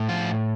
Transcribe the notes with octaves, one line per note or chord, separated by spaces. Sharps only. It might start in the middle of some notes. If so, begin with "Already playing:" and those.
Already playing: A2
F3 F4